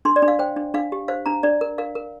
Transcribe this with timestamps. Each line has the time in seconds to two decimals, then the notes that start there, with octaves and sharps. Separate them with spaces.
0.05 D4 C6
0.16 D5
0.22 D4
0.28 F5
0.39 C5 G5
0.56 D4
0.74 D4 F5
0.92 G4
1.08 C5 F5
1.26 D4 A#5
1.43 D4 D5
1.61 A#4
1.78 A#4 F5
1.95 A#4